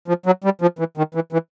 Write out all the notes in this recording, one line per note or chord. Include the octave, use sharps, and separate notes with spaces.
F3
F#3
G3
F3
E3
D#3
E3
E3